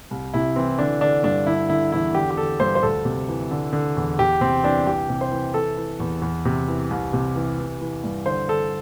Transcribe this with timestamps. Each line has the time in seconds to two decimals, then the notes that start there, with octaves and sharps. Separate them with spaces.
0.11 C2
0.34 C3 E4
0.56 E3 C4
0.79 D3 D4
1.01 D3 D4
1.24 G2 D4
1.47 D3 E4
1.69 D3 E4
1.92 E2 E4
2.14 D3 G4
2.30 G4
2.37 D3 A4
2.60 G2 C5
2.75 C5
2.83 D2 A4
3.05 C3
3.28 E3
3.51 D3
3.73 D3
3.97 E2
4.19 E2 G4
4.41 C3 C4
4.63 E3 D4
4.87 C2 G4
5.09 C3
5.21 C5
5.32 E3
5.54 E3 A4
5.77 E3
6.00 E2
6.22 E2
6.45 C3
6.68 E3
6.90 C2
7.13 C3
7.36 E3
7.59 E3
7.81 E3
8.04 G2
8.26 D3 C5
8.48 D3 A4